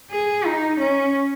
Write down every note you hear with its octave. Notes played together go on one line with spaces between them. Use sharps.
G#4
D#4
C#4